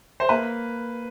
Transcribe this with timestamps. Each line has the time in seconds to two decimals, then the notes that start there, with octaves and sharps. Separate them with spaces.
0.20 C5
0.29 A#3 B4